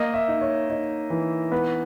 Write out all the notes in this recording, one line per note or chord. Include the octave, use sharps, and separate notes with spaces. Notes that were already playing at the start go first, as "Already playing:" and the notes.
Already playing: A#3 D#5
E5
D#4
C#5
D#4
E3
B3 B4